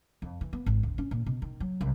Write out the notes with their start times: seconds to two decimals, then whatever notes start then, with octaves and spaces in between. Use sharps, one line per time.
0.22 F2
0.41 E3
0.53 B3
0.66 G#1
0.83 D2
0.98 C#4
1.11 A#2
1.26 B2
1.42 D#3
1.60 F#3
1.81 C2